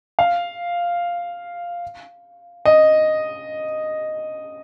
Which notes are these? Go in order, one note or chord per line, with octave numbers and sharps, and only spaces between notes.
F5
D#5